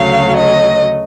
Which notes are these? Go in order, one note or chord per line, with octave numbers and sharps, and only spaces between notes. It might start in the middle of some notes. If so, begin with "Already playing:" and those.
Already playing: D2 C#3 F#3 A3 F5
D#5